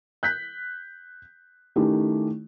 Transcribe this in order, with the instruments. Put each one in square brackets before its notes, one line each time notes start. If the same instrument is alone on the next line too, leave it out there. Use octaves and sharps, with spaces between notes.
[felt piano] F#6 G6 B6
D#3 A3 C#4 D#4 E4 G4